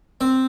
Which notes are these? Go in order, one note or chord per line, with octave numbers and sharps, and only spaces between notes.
C4